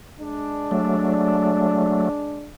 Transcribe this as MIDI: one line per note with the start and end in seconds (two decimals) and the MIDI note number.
0.20 2.49 56
0.20 2.49 62
0.71 2.09 54
0.71 2.09 57